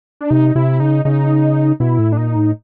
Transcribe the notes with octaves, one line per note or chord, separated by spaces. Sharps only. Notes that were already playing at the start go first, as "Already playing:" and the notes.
D4
C3 D#4
C3 E4
C#3 D#4
C#3 D#4
B2 E4
A2
D4
A#2 D#4
A2